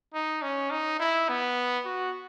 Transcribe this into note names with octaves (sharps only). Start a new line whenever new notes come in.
D#4
C#4
D#4
E4
B3
F#4